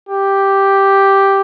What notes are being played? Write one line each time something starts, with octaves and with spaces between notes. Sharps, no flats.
G4